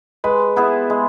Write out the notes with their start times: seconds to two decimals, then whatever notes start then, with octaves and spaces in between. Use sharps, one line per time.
0.24 G#3 B4
0.56 B3 E4 G#4
0.90 G#3